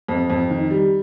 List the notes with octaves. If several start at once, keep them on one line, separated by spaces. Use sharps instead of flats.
F2
F2
D#3
G3